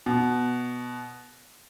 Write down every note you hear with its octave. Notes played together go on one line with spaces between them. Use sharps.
B2